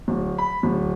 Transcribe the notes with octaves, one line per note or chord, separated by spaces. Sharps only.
D1
B5
D1